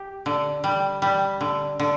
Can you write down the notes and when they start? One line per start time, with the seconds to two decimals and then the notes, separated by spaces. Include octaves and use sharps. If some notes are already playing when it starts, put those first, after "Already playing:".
Already playing: G4
0.26 D3
0.64 G3
1.02 G3
1.41 D3
1.80 D3